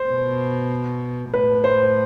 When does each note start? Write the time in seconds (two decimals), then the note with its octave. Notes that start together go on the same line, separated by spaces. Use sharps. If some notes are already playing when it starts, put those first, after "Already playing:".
Already playing: C5
0.09 B2
1.32 A2 B4
1.64 C5